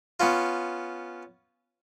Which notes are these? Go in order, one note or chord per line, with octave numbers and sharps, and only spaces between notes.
B3 C#4 F4